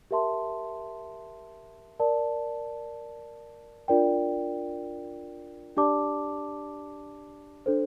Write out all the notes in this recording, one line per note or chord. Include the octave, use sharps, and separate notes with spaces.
G4 A#4 E5 A5 C6
A#4 D5 A5
D4 F4 A#4 D5 G5
D4 G4 D5 A5 D6
D4 A4 C5